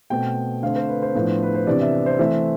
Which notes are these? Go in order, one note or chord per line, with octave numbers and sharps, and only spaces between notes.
B2 A3 C4 G5
D3 A3 C4 F5
C5
B4
C5
A2 F3 B3 D4
B4
C5
C3 E3 B3 D4 D5
E5
C5
E3 A3 C4 E5